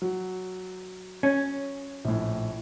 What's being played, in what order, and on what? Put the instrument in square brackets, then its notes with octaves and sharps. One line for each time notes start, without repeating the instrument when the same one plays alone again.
[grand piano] F#3
[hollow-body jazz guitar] C#4
[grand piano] A#1 A2